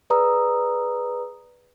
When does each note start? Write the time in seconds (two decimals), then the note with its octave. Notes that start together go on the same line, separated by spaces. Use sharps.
0.10 G#4 B4 D5 A#5 D#6 E6